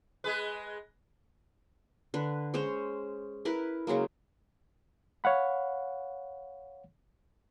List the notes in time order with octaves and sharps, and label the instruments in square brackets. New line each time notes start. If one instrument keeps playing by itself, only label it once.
[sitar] G#3 G#4 B4
[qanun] D3 B4
G#3 C#4 C5 C#5
E4 A#4 B4
C#3 F#3 G#3 A#3
[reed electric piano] C#5 F5 F#5 B5